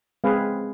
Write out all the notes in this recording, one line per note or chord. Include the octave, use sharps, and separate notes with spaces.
G#3 C4 G#4 B4 F5